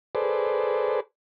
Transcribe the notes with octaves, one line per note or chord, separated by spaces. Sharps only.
G#4 A4 B4 C5 D5